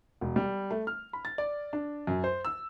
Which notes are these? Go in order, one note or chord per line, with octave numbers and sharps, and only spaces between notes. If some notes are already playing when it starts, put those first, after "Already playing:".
E1
G3
A3
F6
B5
A6
D5
D4
F#2
C5
E6